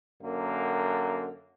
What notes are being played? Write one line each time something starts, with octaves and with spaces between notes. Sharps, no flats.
F#2 D3 A#3